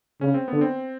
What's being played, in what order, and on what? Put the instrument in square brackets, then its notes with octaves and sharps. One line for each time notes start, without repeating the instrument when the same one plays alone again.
[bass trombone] C#3 [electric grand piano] C#4
[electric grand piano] C4
[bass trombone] D3 [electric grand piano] B3
[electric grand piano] C4